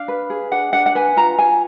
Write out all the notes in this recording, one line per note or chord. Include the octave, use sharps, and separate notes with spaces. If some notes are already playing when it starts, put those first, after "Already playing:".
Already playing: D4 F5
B4
G#4
D4 F#5
D4 F#5
F#5
B4 G#5
F4 A#5
F4 G#5